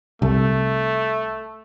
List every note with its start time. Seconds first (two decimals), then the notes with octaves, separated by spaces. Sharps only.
0.22 C2 A3